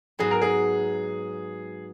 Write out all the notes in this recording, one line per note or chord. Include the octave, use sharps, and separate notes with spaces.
G#2 F#3 B3 G#4
A#4
G#4